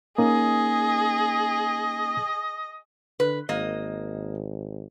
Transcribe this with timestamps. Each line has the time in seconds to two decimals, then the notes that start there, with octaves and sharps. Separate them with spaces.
0.18 A#3 C#4 D#4 G#4 D#5
3.20 D3 B4
3.49 G#1 A#3 D#5